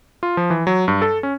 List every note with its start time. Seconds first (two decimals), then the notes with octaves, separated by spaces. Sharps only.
0.23 F4
0.37 F3
0.50 E3
0.67 F#3
0.88 G2
1.02 A4
1.23 C#4